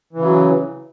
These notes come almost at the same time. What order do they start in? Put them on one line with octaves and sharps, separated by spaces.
E3 C#3 F#3